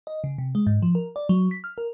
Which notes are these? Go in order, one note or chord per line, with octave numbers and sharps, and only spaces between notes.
D#5
C#3
C3
G#3
G#2
F3
A#4
D5
F#3
B6
F6
A#4